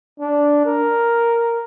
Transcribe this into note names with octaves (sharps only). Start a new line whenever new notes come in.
D4
A#4